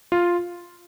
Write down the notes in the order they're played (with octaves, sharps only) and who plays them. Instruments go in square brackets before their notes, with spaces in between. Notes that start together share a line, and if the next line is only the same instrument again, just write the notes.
[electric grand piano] F4